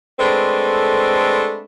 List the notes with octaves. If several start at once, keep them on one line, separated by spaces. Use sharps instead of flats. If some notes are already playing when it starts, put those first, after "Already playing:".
G#3 A3 C4 D4 A4 B4